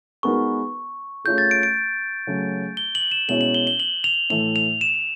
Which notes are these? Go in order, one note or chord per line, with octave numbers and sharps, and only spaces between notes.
G#3 B3 D#4 F#4 A#4 C#6
A3 C#4 F4 G#4 G6
A6
D7
D7
C#3 F#3 A3
G7
F#7
E7
B2 G#3 C#4 E4 F#7
F#7
G7
G7
F#7
F7
A2 E3 A3 F7
F7
E7